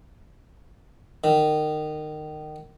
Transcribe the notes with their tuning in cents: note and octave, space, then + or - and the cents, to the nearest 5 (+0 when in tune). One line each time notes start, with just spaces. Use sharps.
D#3 -25